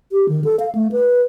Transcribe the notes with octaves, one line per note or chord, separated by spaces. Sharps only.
G4
D#3
A4
F5
A3
B4